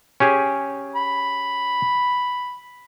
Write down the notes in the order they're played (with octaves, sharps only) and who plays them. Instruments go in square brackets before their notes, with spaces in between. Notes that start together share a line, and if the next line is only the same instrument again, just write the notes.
[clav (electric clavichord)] C#4 G4 G#4
[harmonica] B5